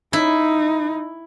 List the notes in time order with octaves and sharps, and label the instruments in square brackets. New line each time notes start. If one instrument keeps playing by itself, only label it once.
[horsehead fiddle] D#4 [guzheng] E4